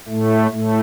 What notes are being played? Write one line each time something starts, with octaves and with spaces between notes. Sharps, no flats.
A2 A3
A2 A3